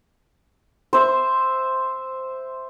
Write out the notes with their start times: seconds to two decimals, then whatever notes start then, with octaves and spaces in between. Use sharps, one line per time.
0.93 C5 E5